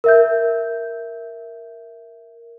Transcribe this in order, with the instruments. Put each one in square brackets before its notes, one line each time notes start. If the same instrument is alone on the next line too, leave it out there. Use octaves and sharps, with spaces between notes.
[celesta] A#4 E5 G6